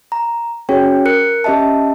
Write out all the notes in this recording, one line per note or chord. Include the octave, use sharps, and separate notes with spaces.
A#5
C#4 F#4 G#4 C#5 G5
A#4 F#6 C#7
C#4 G4 D#5 E5 A5